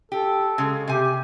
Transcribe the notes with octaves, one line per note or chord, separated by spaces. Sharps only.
G4 A4
C#3 G#3
C3 G4 G#5